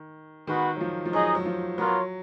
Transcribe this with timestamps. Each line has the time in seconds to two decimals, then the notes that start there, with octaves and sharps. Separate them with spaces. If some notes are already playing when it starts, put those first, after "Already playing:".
Already playing: D#3
0.47 D#3 G#3 B3 F#4 B4
0.76 F#3
0.80 F3
1.05 F3
1.13 F#3 D#4 G#4 D#5
1.35 F#3
1.46 F3
1.78 F#3 B3 F4 A#4 C#5